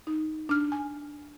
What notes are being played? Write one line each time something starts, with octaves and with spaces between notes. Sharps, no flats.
D#4
D4 F6
G#5